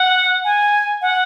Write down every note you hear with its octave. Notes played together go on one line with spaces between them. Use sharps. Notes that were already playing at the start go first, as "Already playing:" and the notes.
Already playing: F#5
G#5
F#5